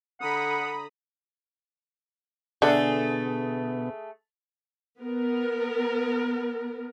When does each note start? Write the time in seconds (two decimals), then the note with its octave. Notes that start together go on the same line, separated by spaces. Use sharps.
0.20 D3 F#5 A#5 B5 D#6
2.62 B2 D3 A3 B3 G#4 A4
5.00 B3 A#4